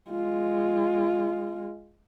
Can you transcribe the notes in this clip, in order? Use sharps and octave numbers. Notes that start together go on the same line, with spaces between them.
G#3 F4